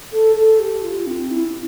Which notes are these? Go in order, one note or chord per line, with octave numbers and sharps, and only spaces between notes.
A4
A4
G4
F4
C4
E4